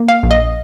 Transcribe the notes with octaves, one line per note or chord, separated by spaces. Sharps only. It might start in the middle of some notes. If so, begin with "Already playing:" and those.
Already playing: A#3
F5
A#1
D#5